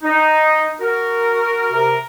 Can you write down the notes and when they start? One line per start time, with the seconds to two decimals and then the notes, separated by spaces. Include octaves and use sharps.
0.02 D#4
0.79 F#4 A#4
1.72 C3 A#4